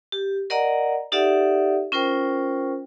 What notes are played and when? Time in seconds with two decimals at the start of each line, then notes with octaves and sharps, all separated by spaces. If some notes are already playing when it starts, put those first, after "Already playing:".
0.12 G4
0.50 A#4 D5 D#5 F#5 A#5
1.12 D#4 G4 A4 D5 E5 F#5
1.92 C#4 F4 A#4 C5 G5